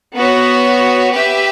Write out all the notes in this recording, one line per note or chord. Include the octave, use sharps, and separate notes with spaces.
B3 F#4 C#5
G4 B4 E5